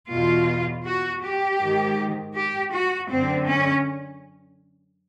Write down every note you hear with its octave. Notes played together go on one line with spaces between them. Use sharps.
E2 B2 F4
F#4
G4
G#2 D#3
G4
F#4
F#2 D3 C4
C#4